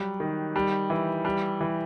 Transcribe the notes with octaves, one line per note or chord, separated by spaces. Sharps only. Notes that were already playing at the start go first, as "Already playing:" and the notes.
Already playing: F#3 G3
D#3
G3
E3
G3
E3